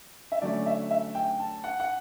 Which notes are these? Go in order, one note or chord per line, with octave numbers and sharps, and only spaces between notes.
E5
D3 F#3 A3 C#4 D5
E5
E5
G5
A5
F#5
F#5